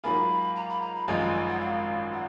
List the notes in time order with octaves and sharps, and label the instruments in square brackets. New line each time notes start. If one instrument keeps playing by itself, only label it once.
[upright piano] G#2 F#3 A#3 F4 G#4 [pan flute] B5
[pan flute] A#5
B5
A#5
B5
[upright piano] G#1 F#2 F3 G#3 [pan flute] A#5
[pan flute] G#5
G#5
F#5
F5
F#5